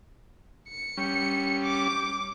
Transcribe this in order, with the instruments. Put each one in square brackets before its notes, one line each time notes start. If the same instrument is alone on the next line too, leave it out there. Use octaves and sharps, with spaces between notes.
[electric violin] C#7
[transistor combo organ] G3 C#4
[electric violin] D6